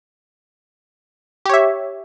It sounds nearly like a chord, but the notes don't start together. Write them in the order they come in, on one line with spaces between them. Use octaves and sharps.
G4 C#5 E5